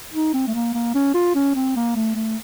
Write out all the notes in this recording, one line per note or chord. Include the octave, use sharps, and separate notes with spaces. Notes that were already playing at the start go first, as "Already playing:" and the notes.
D#4
C4
A3
A#3
A#3
C#4
F4
C#4
C4
A#3
A3
A3